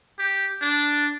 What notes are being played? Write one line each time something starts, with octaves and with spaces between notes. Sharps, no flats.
G4
D4